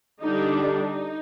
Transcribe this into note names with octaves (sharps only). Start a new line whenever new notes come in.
D3 G3 D4 D#4
D#4